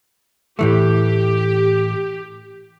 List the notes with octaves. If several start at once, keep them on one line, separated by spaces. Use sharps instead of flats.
A2 E3 A3 G4